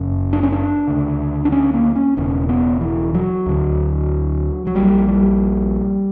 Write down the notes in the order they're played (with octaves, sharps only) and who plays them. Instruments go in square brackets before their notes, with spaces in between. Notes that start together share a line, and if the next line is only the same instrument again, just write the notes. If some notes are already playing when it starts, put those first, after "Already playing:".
Already playing: [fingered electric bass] F#1 F#2 C#3
D4
C#4
D4
D2 C#3
D4
C#4
A#3
C#4
E1 E2 C#3 C#4
B3
E3
F#3
D2 D3
F#3
A#1 A#2 G3
G3